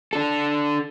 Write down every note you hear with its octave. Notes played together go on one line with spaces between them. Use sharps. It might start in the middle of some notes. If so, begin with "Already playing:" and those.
D4 A4